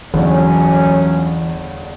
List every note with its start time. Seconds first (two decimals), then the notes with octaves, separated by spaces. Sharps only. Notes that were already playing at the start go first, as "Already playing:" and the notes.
0.14 G1 E2 E3 F#3 A3 C#4